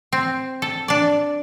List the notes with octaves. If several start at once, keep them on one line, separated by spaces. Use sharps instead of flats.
C4
A4
D4 D5